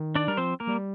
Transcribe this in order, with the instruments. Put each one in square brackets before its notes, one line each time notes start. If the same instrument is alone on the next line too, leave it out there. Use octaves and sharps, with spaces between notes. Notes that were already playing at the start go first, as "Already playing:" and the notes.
Already playing: [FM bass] D#3
[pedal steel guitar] D4 D5
[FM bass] G3 [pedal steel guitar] A#4
[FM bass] F3 [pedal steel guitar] C4 C5
[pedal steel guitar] A#3 A#4
[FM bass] G3